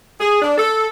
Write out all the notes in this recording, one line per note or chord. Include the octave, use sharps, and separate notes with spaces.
G#4
D4
A4